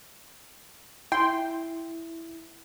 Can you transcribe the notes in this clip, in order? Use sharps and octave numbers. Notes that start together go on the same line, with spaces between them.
E4 G5 C6